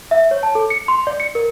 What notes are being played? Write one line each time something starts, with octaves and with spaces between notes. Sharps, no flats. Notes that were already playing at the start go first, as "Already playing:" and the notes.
E5
C#5
A5
A4
C#7
C6
D5
C#7
A#4